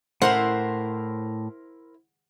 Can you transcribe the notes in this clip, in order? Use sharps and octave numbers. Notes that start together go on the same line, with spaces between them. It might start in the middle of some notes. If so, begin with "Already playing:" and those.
A2 E4 A#4 C5 F#5